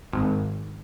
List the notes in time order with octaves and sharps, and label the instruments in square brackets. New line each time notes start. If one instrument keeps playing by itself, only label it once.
[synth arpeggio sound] G#1